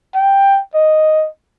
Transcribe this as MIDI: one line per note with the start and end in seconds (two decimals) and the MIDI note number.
0.15 0.60 79
0.74 1.27 75